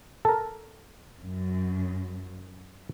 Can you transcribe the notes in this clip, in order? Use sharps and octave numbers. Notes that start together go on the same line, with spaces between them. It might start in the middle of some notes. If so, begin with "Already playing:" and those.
A4 A#4
F#2